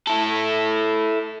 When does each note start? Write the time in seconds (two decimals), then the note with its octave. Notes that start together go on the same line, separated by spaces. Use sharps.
0.07 E4 A4